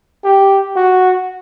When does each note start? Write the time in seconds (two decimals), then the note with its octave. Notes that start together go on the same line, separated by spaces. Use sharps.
0.24 G4
0.76 F#4